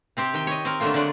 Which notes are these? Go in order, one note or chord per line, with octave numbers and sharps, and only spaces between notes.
C3 C4 G4
D#3 G5
C#5 D#5
C4 A#4
D3 F#3 A3 A#3 F4
D3 F#3 G#3 D5 F#5